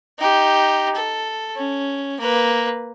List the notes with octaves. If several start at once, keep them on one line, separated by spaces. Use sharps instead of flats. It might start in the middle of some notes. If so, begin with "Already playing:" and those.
D#4 G4
A4
C#4
A#3 B4